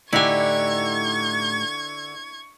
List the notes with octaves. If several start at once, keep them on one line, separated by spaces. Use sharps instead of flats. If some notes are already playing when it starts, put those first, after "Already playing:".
A2 D3 D#4 E4 G4 G#5 C#6 G#6